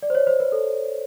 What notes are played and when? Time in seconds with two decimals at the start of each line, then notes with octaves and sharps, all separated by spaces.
0.03 D5
0.10 C5
0.15 C#5
0.27 C5
0.40 B4
0.52 A4